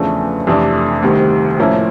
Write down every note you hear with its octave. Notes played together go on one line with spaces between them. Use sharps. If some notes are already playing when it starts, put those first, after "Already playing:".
Already playing: E2 C#3 F3 A3 D4
F2 C3 E3 A3 D4
D2 C3 D#3 G3 C4
A2 F3 A#3 C#4 E4